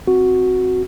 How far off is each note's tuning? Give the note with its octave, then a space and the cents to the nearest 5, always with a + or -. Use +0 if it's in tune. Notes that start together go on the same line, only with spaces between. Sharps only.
C4 +0 F#4 +0